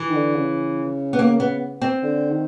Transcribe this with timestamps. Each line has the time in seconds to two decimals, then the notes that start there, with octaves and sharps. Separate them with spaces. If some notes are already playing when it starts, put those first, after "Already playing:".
Already playing: E3
0.09 D#3
0.14 D3
0.36 C#3
1.13 B3
1.19 A#3
1.40 B3
1.82 C4
2.03 D3
2.30 D#3